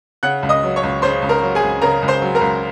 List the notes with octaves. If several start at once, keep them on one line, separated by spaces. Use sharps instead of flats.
C#3 F#5 F#6
C#2
D#5 D#6
F#3
C#5 C#6
C#2
C#3 C5 C6
C#2
A#4 A#5
F#3
G#4 G#5
C#2
C#3 A#4 A#5
C#2
C5 C6
F#3
A#4 A#5
C#2